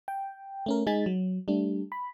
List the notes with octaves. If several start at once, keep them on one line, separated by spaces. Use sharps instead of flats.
G5
A3 C#4 A#4
G#3 D#4 G#5 A6 B6
F#3
G3 A3 D4
B5